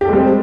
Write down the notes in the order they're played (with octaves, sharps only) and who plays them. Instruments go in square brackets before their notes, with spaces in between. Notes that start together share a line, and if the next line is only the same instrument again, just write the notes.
[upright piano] G4
A4
G#3
G3
C4